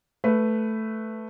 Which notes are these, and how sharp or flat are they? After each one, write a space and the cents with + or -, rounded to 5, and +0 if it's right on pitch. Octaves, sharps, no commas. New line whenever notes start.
A3 +0 B4 +5